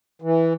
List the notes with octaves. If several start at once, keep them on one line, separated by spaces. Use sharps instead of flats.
E3